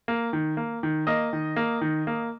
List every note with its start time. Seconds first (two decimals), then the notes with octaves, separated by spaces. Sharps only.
0.08 A#3
0.33 D#3
0.57 A#3
0.83 D#3
1.07 A#3 D#5
1.33 D#3
1.56 A#3
1.81 D#3
2.07 A#3